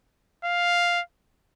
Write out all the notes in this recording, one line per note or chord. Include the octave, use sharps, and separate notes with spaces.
F5